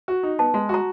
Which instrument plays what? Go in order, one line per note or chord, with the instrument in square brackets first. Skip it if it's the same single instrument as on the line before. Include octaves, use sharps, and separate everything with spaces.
[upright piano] F#4
D#4
[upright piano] B3 [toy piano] A5
[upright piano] G#3
[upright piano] F#4 [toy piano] A#5